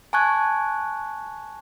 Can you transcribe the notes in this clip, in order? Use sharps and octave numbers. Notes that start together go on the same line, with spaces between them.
G#5 A5 C#6 F#6 G#6